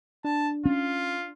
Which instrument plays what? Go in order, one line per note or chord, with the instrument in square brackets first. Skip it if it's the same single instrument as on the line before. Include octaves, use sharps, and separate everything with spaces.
[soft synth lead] D4 [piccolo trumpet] A5
[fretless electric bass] C#4 [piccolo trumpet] F4